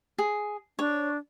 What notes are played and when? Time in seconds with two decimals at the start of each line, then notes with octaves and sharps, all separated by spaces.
0.18 G#4
0.79 D4 C#5